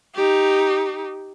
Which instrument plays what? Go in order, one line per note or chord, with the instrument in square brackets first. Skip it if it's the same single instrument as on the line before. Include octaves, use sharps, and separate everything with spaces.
[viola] D#4 G4